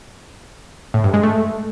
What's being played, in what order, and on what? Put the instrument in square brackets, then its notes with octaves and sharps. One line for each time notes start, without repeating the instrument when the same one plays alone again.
[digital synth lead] A2
G2
G#3
A3